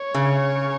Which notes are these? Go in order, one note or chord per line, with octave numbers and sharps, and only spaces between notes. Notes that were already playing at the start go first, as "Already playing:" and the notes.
Already playing: C#5
C#3